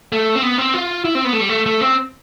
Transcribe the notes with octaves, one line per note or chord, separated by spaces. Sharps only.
A3
C4
B3
C4
F4
E4
C4
B3
A3
G3
A3
A3
C4